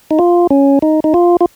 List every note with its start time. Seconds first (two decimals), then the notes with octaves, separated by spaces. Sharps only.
0.11 D#4
0.19 F4
0.50 C#4
0.82 D#4
1.04 D#4
1.14 F4
1.41 F4